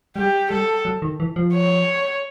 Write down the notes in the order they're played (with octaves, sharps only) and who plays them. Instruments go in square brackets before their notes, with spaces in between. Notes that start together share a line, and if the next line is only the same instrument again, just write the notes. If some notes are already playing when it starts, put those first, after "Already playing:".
[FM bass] G3 [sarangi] G4
[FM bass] G3 [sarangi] A4
[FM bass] F#3
D#3
E3
F3
[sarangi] C#5